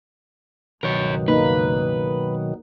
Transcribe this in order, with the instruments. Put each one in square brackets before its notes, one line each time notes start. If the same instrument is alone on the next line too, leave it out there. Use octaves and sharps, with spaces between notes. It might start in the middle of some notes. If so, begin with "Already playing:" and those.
[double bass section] C#2 G2 [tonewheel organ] B2 D#3 F#3 [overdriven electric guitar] A#4 C#5
[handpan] A#3 D#4 [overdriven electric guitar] B4